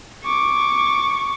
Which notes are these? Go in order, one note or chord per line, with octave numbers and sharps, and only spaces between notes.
C#6 D6